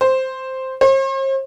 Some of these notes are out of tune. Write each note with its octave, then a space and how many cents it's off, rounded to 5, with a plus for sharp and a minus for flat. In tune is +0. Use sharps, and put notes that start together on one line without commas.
C5 +0
C5 +45